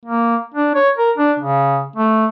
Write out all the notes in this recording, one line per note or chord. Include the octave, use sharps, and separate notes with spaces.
A#3
D4
C#5
A#4
D4
C#3
A3